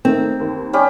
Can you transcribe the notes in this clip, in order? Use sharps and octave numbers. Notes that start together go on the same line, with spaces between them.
D#3 A3 C4
D#2
G3 C#4 G4